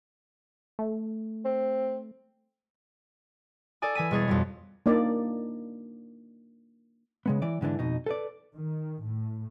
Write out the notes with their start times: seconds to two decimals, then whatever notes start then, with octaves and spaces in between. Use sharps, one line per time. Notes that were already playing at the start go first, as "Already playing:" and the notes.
0.79 A3
1.45 C4
3.82 A4 D5 G#5 D#6
3.95 E3 G#5 B6 D#7
4.11 E1 G3 G#4 C#5 D#6 A6
4.28 F2 B2 G3
4.86 A#3 D4 D#4 D5 D#5
7.26 C#3 G#3 B3
7.42 E3 D5
7.61 G#2 D3 E3 D4
7.79 F2 B2 D#4
8.06 A4 B4 D5
8.55 D#3
9.02 A2